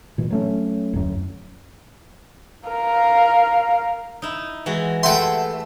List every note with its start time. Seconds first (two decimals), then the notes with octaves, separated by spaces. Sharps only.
0.18 A#2 E3
0.30 F#3 A3 C#4
0.93 D1 F#2
2.69 A#4 F5
4.22 D#4 E4
4.66 E3 G#3 F#4
5.03 A3 E4 G4 E5 F#5 G5 A5 C6